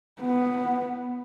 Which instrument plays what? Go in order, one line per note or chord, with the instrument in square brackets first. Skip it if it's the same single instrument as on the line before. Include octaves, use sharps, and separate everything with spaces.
[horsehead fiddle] B3